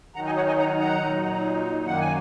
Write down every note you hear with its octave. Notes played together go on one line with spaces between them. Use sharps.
D#3 F#3 D#4 F#5 A#5
D#5 G#5
C#5 F#5
D#5 G#5
F#5 A#5
F#5 A#5
A#2 F#3 D#4
F#2 D#3 A#3 F#5
G#5